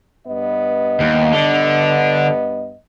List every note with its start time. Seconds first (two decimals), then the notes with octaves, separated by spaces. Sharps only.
0.27 G2 B3 D#5
1.00 D#2
1.33 D3